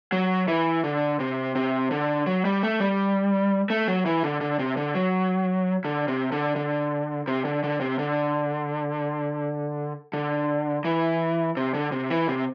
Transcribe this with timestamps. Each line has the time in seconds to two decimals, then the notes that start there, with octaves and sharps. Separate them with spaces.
0.12 F#3
0.48 E3
0.84 D3
1.20 C3
1.55 C3
1.91 D3
2.26 F#3
2.45 G3
2.63 A3
2.80 G3
3.70 A3
3.88 F#3
4.06 E3
4.23 D3
4.41 D3
4.59 C3
4.77 D3
4.95 F#3
5.85 D3
6.08 C3
6.32 D3
6.56 D3
7.28 C3
7.45 D3
7.63 D3
7.81 C3
7.99 D3
10.13 D3
10.85 E3
11.57 C3
11.74 D3
11.92 C3
12.10 E3
12.28 C3